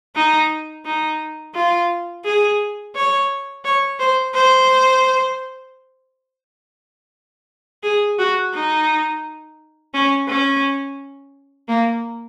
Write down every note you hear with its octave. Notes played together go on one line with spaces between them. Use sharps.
D#4
D#4
F4
G#4
C#5
C#5
C5
C5
G#4
F#4
D#4
C#4
C#4
A#3